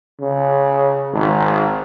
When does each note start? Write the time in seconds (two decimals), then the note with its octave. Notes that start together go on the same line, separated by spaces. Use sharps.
0.20 C#3
1.13 G#1